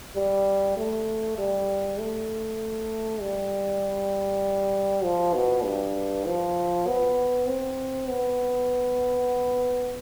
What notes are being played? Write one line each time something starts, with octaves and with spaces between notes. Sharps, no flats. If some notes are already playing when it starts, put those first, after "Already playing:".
G3
A3
G3
A3
G3
F3
B2
G2
F3
B3
C4
B3